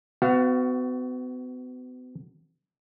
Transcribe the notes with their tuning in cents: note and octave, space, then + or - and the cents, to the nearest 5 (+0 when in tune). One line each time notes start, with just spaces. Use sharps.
B3 +40 F#4 +15 F5 -5